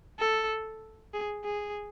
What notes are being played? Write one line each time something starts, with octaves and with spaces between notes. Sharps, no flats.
A4
G#4
G#4